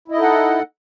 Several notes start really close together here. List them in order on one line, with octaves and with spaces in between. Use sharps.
E4 D#5 D#4 A4 F#5